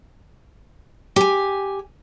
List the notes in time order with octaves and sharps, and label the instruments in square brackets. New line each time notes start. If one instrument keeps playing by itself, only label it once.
[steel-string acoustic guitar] G4 G#5